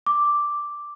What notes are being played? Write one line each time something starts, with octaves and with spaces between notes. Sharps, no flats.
D6